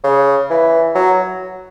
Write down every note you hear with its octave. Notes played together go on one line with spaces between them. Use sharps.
C#3
E3
F#3